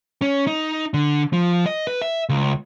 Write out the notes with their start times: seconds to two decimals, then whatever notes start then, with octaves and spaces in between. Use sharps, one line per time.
0.22 C#4
0.47 D#4
0.94 D3
1.33 F3
1.66 D#5
1.87 B4
2.02 E5
2.29 C#2